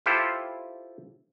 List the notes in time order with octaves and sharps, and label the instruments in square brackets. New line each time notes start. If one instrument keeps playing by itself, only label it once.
[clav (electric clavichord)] E4 F4 G4 A4 C5